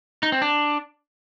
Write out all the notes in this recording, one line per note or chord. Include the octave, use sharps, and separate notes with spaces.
D#4
C4
D4